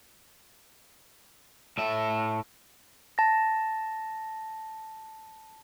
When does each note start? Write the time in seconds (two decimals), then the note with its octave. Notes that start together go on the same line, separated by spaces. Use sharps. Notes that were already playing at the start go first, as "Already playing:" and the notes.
1.78 A2 E5
3.18 A5 A#6